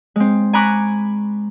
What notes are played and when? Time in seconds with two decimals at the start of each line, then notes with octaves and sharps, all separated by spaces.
0.16 G#3 C4
0.53 G#5 A#5 B5 C#6 D6 F#6